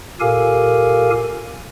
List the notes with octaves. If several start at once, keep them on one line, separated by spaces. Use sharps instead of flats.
A#2 G4 A4 A#4 F5 G#5